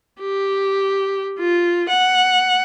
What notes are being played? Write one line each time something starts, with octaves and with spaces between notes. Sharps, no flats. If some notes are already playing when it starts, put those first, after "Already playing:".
G4
F4
F#5